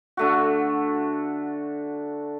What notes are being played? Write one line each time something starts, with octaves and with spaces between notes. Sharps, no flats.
D3 A3 F#4